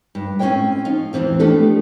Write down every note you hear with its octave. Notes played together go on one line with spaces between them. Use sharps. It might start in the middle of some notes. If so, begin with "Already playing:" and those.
G2
C4 C#4 D#4 F4 C#5 G5
F3 D#4 F4
E2 G#2 E3 C4 F4
F3 A3 B3 D4 G4 A4